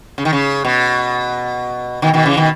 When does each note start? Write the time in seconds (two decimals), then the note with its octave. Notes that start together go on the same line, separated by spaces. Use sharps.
0.18 C#3
0.25 D#3
0.33 C#3
0.65 B2
2.02 B2 D#3
2.14 B2 D#3
2.26 C#3 E3
2.37 B2 D#3